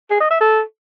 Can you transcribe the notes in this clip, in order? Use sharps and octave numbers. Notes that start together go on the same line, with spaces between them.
G#4
D#5
E5
A4